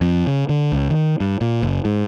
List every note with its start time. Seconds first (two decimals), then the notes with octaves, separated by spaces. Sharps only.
0.01 F2
0.27 C#3
0.49 D3
0.72 C#2
0.90 D#3
1.20 G2
1.41 A#2
1.63 F#1
1.85 G#2